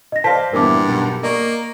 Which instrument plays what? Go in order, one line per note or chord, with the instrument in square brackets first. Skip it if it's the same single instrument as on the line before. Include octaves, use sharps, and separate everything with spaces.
[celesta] D#5 A#6
[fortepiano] C5 D5 F5 [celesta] A5 B6
[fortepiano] E2 A#2 [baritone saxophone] G2 [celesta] A#4 D6
[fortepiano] B1
[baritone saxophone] A#3 [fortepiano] D5 D#5 C#6